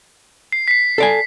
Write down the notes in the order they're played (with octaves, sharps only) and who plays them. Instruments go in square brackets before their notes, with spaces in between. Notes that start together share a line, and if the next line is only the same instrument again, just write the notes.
[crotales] C7
B6 C7
[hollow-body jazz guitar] A4 D5 G#5